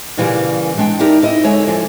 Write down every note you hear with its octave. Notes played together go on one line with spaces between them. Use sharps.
A#2 C#3 E3 G3 A#3
G#3 D4 G5
D#4 E4 G4 A#4 D5
D#4 E4 D#5
D2 D3 G#3 C#5 E5
E3 F3